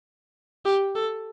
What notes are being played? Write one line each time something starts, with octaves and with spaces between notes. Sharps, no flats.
G4
A4